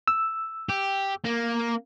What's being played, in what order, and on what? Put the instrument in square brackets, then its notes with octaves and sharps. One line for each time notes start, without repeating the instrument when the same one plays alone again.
[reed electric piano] E6
[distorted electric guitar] G4
A#3